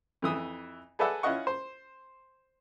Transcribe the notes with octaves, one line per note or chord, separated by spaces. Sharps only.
F2 E3 D#6 E6
G#4 A4 B4 D5 E5 F#5
C#4 E4 F4 D#5 F#5 C#6
C5